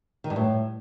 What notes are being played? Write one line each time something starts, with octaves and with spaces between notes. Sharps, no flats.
D#3
G2
A2